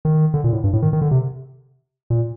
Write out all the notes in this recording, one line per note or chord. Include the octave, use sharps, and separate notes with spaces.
D#3
D3
A#2
A2
G2
A2
D#3
D#3
D3
C3
A#2